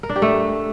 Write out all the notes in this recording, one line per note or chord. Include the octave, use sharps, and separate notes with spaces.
A#4
D4
G4
A3